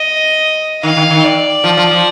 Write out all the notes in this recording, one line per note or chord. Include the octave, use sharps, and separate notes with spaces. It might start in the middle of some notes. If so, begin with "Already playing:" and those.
Already playing: D#5
D#3 F5
D#3
D#3
D5
F3
F3
F3